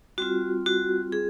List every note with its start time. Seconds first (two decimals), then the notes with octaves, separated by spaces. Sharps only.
0.18 G3 C4 F4 F#4
0.66 F#4
1.12 G#4